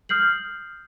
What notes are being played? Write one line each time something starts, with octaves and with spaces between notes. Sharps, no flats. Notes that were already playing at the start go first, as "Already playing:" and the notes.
D#6 F6 G6 C7 F#7